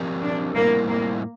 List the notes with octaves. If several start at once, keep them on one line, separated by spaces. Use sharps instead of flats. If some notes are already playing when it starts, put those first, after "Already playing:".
Already playing: F3 C4 G4 A#4
D4
A2 G3 A#3 C4 E4 A#4
A#3